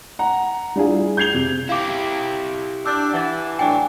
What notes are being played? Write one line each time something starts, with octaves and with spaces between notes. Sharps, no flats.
F#5 A#5
G3 D4 E4 F4 G#4
G6 G#6 C7 F7 G7
C3
E4 G4 F5 D6
D4 E6 G6
E3 F#5 A6
A2 F#3 D4 G5 G#5